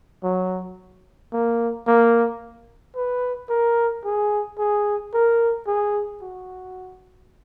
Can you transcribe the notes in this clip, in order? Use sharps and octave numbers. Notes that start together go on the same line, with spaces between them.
F#3
A#3
A#3
B4
A#4
G#4
G#4
A#4
G#4
F#4